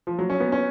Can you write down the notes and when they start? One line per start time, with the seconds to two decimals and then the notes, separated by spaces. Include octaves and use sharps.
0.07 F3
0.19 F#3
0.30 C#4
0.40 B3
0.52 C#4